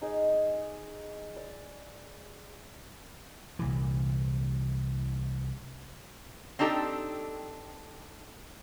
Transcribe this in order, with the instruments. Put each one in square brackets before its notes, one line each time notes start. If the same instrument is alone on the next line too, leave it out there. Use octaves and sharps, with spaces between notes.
[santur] D#4 G#4 D#5
D5
[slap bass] C2 A#2 E3
[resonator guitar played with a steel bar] C4 D4 D#4 G4 A4